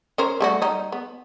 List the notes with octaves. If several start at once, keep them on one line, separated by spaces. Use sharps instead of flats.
C#4 A#4 C5
G3 A3 F#4
G3 D#4
B3